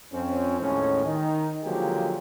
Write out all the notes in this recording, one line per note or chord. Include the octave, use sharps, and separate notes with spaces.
F2 C4 C#4
A1 D#2 A2 G#3 C#4
D#3 D#4
D3 F3 F#3 G#3 A#3 G4